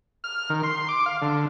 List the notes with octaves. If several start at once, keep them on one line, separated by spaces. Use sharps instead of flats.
F6
D#3
C6
D6
F5
D3